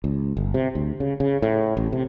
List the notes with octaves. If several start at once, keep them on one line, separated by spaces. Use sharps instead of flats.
C#2
G1
C3
D2
C#3
C#3
A2
A1
C3